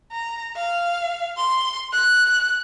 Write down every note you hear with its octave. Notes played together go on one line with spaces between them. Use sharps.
A#5
F5
C6
F#6